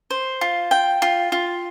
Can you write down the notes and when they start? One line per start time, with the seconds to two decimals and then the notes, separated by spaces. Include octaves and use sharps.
0.10 C5
0.41 F4
0.71 G5
1.02 F4
1.32 F4